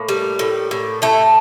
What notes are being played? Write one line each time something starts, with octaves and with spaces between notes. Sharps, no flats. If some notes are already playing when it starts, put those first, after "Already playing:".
Already playing: A2 A#3
G3
A2
A2
A2 A3